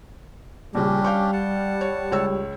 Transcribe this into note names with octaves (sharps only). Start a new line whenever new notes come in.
A#1 C#3 G3 C#4 D4 G4
F5 G5 C#6
F#5 A5
C#5
C#2 C#5 E6